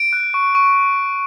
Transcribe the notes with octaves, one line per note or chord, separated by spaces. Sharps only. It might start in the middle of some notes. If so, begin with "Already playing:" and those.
Already playing: D7
F#6
C#6
C#6